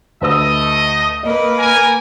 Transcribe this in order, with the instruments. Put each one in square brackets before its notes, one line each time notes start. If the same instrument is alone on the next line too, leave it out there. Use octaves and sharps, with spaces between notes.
[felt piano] D2 B4 E6 [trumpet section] A3 D#5
[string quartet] A#3 B4 [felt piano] D#5
[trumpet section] A#4 G#5